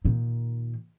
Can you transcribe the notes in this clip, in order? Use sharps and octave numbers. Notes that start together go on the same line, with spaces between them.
A#2 D#3